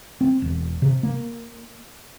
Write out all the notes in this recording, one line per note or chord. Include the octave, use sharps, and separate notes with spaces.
C4
E1
C3
A#3